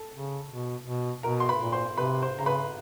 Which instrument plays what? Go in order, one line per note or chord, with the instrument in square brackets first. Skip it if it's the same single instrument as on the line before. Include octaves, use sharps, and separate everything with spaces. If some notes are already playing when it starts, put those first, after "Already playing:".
Already playing: [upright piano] A4 A5
[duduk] C#3
B2
B2
[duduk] B2 [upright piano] A#4 A#5
[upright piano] C6
B4 B5
[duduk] A#2
[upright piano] C5 C6
[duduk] C3 [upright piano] B4 B5
[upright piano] C5 C6
[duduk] C#3 [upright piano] A#5
[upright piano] B4 B5